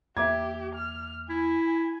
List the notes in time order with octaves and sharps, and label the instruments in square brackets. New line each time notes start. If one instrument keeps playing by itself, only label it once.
[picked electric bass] E2 A#3 [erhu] G4 [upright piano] E5 D6 G#6
[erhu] F6
[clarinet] E4 [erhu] G#5